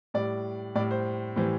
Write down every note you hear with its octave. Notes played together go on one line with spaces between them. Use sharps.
A2 G3 D5
A2 G3 D5
C5
A2 E3 G3 C5